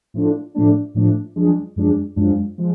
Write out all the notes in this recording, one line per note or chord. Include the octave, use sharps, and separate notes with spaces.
A2 F3 A3 D4
A2 F3 A3 D4
A2 F3 A3 D4
F#2 F3 G#3 D4
F#2 F3 G#3 D4
F#2 F3 G#3 D4
F3 G#3